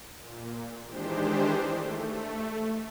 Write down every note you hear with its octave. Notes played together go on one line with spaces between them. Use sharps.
A#2
D#3 E3 G#3 D4 G4 C5
A3